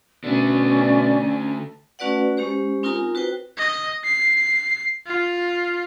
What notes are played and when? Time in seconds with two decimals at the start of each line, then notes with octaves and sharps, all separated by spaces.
0.24 B2 D3 A3 C#4 D5
1.99 A3 C#4 F#4 B4 D5 F#5
2.37 G#3 C#4 G4 C5
2.83 C4 D#4 F4 A#4 G#5 A#5
3.15 F#4 B4 C5 G5
3.57 D#5
4.04 C7
5.07 F4